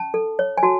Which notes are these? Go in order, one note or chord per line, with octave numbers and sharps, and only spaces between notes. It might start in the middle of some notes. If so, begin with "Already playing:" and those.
Already playing: C#4 A5
A4
C#5
G#5
F#4 A5